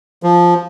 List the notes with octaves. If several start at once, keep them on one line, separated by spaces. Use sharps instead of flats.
F3